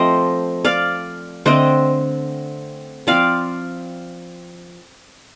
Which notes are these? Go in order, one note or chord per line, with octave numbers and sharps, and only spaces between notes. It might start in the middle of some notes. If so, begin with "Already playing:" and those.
Already playing: F3 A3 C4 C5 D#5
D5 F5
D3 A3 C4 C5 D#5
F3 C4 D5 F5